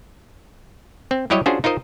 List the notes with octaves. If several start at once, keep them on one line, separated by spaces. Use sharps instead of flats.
C4
F#3 G3 E4 G4 C#5 D#5
C#4 D4 F4 F#4 G#4 C5
D#4 F4 A#4 C5 D#5